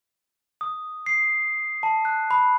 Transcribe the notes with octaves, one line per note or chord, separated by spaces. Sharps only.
D#6
C7
A5
F#6
B5